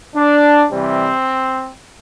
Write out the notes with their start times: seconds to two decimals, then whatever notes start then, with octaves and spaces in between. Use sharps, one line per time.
0.16 D4
0.71 C3 E3 G3 C4